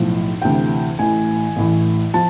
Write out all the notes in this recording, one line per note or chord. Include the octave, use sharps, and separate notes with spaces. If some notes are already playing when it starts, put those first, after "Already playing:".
Already playing: B1 A2 F3
D2 C3 E3 G5
A1 A2 E3 G#5
A1 A2 E3
F3 A5